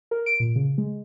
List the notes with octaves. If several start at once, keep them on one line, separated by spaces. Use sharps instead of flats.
A#4
D7
A#2
C#3
G#3